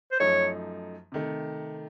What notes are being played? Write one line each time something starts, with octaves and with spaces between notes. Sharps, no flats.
C5
F#2 F3 A3 D#4 C#5
C3 D#3 A3